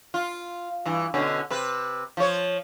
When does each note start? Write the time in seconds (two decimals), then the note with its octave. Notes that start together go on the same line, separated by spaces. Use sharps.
0.14 F4
0.86 G2 E3
1.14 B2 D3 C#4
1.50 C3 B4
2.17 F3 C#5